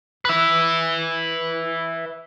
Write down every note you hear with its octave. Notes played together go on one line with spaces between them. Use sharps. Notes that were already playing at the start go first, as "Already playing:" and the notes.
B4 E5